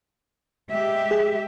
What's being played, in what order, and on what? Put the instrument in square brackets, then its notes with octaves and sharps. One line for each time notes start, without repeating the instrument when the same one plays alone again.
[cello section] G#3 G4 E5
[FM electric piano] G#4